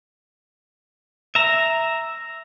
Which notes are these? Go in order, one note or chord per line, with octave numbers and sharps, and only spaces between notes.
E5 A#5